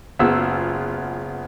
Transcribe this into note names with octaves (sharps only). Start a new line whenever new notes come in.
F#1 B3 F4 G#4 E6